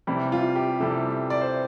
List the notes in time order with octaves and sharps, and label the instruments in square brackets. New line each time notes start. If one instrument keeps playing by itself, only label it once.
[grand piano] C3 E3 G3 E4
F4
G4
C3 E3 G3 A4
D5
C5